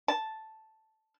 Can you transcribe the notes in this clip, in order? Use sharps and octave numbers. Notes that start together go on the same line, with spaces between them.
A5